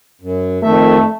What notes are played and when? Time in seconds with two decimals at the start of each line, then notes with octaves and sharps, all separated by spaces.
0.21 F#2
0.63 F2 D#3 A3 E5